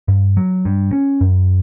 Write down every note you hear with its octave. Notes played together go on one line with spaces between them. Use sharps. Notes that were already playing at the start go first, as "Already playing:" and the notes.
G2
F#3
G2
C#4
F#2